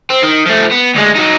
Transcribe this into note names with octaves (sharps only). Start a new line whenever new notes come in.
C4
D#3
F3 A3
B3
D2 G#3
F#3 D#4